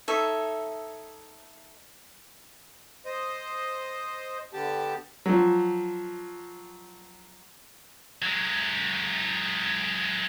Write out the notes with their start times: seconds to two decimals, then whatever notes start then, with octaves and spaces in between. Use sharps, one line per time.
0.08 D#4 A4 C#5 E5
3.06 C5 D#5
4.53 D3 B3 G4 A5
5.26 F3 F#3
8.22 F#3 G#3